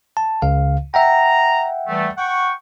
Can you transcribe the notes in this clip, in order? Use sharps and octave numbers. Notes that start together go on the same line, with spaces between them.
A5
C#2 C#3 F5
E5 F#5 G5 A#5
E3 G3 A3
F#5 G5 C#6